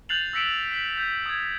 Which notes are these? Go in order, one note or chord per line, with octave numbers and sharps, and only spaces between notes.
F#6 G6 A6 C7 F7 F#7
E6 A#6 B6 C#7 D7 E7
B6
G6
D#6 G#6